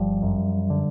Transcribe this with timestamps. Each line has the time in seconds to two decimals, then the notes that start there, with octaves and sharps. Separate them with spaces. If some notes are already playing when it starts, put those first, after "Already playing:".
Already playing: G1 F3 G3
0.23 F#2
0.70 D3